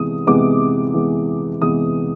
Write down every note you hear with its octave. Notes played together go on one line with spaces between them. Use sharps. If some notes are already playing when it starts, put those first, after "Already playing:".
Already playing: C3 E3 G#3 B3 D#6
C3 E3 G#3 B3 D6
C3 E3 G#3 B3
C3 E3 G#3 B3 D#6